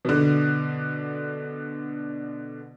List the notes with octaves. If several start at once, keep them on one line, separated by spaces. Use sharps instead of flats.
B2 D3